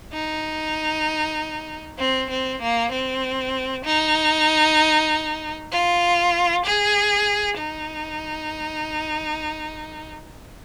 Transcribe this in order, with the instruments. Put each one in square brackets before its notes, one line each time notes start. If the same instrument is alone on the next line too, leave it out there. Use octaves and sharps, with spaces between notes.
[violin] D#4
C4
C4
A#3
C4
D#4
F4
G#4
D#4